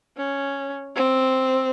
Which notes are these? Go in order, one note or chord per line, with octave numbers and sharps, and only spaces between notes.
C#4
C4